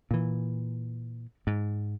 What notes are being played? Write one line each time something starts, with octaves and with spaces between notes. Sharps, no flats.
A#2 E3
G#2